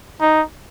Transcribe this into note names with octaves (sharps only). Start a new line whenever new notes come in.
D#4